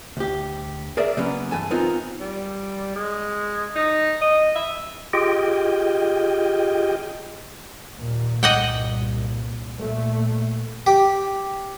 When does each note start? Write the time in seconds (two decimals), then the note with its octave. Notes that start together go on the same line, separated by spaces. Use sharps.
0.17 D2 G4
0.97 G#4 A#4 D5 E5
1.17 C#3 F#3 A#3 B3 C#4
1.51 G2 E3 A4 G#5
1.71 B3 C4 D#4 F4 A#4
2.20 G3
2.95 G#3
3.75 D#4
4.21 D#5
4.56 E5
5.13 F4 G4 G#4 D#5 G5
7.96 D#2 A#2
8.43 C2 G2 A#2 D#5 F#5 G5
9.76 A#2 A3
10.87 G4